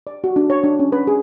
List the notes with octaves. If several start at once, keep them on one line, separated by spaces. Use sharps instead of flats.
D5
F#4
D4
C#5
D4
C#4
B4
G#4